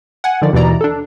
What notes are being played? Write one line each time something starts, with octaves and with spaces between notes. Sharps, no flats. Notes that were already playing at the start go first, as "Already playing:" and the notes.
F#5 G#5
D3 D#3 F3 D5
D#2 B2 E3 D5 A#5
D4 A4